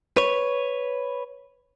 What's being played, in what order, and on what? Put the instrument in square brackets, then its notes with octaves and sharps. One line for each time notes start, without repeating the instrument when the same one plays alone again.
[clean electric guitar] B4 C#5